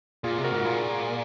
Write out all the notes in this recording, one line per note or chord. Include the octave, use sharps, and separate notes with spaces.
A#2 F4 G#4
C3
F#4 A#4
G#2
A#2 F4 G#4